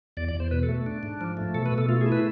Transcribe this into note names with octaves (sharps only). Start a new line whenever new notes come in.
E2 D5
D5
E2 C5
B2 B4
A4
A3
D4
G#2
F3
A3
B2 A4
B4
B2
A4
A3 F4
G#4
E4
B4